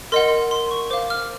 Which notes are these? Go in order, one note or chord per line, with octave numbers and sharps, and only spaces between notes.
A#4 D#5 F#5 C6
C6
C#6
C5 F5 D6
F6